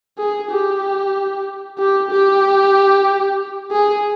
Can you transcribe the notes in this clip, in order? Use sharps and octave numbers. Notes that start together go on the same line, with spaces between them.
G#4
G4
G4
G4
G#4